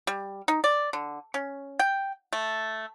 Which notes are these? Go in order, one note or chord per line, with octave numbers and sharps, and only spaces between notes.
G3
D#4
D5
D3
C#4
G5
A3